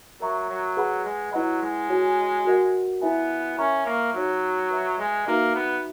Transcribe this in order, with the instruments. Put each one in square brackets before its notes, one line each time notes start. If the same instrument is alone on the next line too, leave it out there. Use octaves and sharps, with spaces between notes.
[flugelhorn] F#3 [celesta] A#4 E5 A#5 C#6
[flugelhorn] F#3
[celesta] G#4 B4 F#5 B5
[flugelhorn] G#3
[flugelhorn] F#3 [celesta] E4 B4 D#5 F#5 B5
[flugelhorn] G#3
[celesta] F#4 C#5 G#5
F#4 A#4 D#5 F#5
[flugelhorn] B3 [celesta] E4 B4 E5 G#5
[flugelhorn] C#4 [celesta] A#4 E5 A#5 C#6
[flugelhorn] A#3
[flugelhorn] F#3 [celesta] D#4 F#4 C#5
[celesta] B4 E5 A#5
[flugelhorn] G#3
[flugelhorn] A#3 [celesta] D#4 F#4 B4 E5 A#5
[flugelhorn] B3